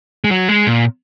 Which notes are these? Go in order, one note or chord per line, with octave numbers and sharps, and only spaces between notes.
G#3
F#3
G#3
A#2